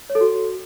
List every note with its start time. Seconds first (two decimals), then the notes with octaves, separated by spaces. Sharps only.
0.10 C#5
0.15 A4
0.21 F#4